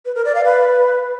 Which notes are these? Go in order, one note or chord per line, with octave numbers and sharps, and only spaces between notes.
B4
A#4
D5
F5
B4